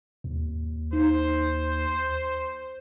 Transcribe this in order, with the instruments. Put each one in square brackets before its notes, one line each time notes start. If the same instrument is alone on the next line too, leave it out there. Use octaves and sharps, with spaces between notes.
[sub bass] D#2
[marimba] D#4 [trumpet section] C5